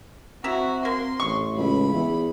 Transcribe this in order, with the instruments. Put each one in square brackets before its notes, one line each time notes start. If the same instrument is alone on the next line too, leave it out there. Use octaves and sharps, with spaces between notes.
[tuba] C4 [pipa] E4 E5 A#5 [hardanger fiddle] F#4
[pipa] A#3 A#4 [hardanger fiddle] C6
[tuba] A1 [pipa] C#6
[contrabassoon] C#2 [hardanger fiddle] B5
[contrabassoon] E2